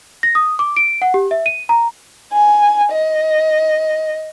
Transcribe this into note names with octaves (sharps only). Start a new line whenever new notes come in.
A#6
D#6
D6
D7
F#5
G4
E5
D#7
A#5
G#5
D#5